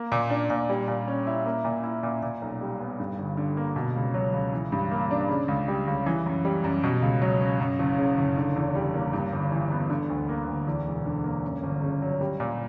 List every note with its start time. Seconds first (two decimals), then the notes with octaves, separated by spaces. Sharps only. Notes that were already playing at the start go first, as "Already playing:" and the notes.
Already playing: A#3
0.12 A#2
0.30 D4
0.50 A#2
0.70 G3
0.88 A#2
1.07 C#4
1.27 E4
1.46 A#3
1.65 A#2
1.84 E4
2.03 A#2
2.23 A#2
2.42 B1
2.61 G3
2.80 B3
3.00 G2
3.18 G1
3.37 D3
3.57 A#3
3.76 B2
3.96 C#2
4.14 F#3
4.34 C#2
4.53 E3
4.72 G2
4.91 A#3
5.11 D4
5.29 C#3
5.48 C#2
5.68 G3
5.87 C#2
6.06 E3
6.26 F#2
6.45 G3
6.64 F#2
6.84 B2
7.02 C#2
7.22 F#3
7.41 C#4
7.60 F#2
7.79 F#1
7.98 C#3
8.18 F#1
8.37 D3
8.56 E2
8.75 G3
8.94 A#3
9.13 G2
9.33 G1
9.52 E3
9.71 B3
9.90 D3
10.10 D2
10.29 A#3
10.47 D2
10.67 E2
10.87 E1
11.06 D3
11.24 A#3
11.44 F#2
11.63 G1
11.82 C#3
12.02 F#3
12.21 G3
12.40 A#2